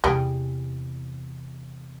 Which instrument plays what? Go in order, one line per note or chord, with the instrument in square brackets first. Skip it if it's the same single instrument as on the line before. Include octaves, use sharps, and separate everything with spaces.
[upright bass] E2 C3 [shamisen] G3 G4 G#4